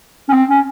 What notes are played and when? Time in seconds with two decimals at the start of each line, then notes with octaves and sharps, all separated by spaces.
0.29 C#4
0.33 C4
0.50 C#4